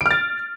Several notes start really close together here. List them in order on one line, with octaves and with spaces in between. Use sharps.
D7 F6 A6